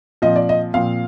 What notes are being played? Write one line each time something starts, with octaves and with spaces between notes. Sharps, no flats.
A#2 F3 C4 D#5
D5
D#5
A#2 F3 C4 F5